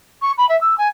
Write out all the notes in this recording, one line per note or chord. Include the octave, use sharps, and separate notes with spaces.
C#6
B5
E5
E6
G#5